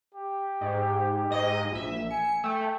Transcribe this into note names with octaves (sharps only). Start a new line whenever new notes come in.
G4
G#2
G#2 D#5
A#1 E5
G#5 C#7
A3 G5